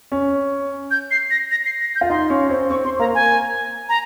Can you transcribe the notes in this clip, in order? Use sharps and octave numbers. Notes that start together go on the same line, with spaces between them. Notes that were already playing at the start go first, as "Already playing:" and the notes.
C#4
G6
C7
A#6
A#6
C7
A#6
G6
F4
D#4 C6
C#4
C4
C4 C#6
C4 C6
A#3 A#5
G#5
A#5